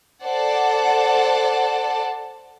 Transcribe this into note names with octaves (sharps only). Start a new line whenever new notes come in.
A4 C5 D5 F#5 A5